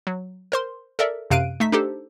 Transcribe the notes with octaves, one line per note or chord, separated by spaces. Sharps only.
F#3
A#4 C5 C6
A4 A#4 D5 E5
F#2 C3 F5 F#6 D7 D#7
A3 D#4 E5 B6
D4 D#4 G4 A4 C5